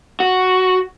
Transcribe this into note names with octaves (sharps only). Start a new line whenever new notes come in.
F#4